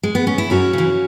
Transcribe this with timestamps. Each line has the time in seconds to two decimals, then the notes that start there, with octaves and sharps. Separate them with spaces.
0.03 G#3
0.15 B3
0.27 C#4
0.38 E4
0.50 F#2 C#4 F#4
0.73 C#3 E3